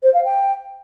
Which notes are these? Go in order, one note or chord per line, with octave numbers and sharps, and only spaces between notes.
C5
F5
G5